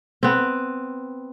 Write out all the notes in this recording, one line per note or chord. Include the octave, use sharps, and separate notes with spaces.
B3 C4